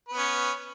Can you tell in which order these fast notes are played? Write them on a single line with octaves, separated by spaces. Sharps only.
B4 B3 C#4